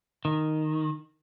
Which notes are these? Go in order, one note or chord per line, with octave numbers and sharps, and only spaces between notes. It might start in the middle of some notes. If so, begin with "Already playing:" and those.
D#3